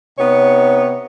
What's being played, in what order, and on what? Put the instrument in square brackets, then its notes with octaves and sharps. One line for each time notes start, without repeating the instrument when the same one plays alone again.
[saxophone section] C3 B3 D#4 C#5